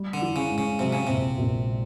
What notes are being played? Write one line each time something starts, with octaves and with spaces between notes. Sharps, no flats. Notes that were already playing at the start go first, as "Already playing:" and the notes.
Already playing: G3
D3
E3
C#3
G#2
C#3
C3 F#3
C#3
A#1 C3
A#1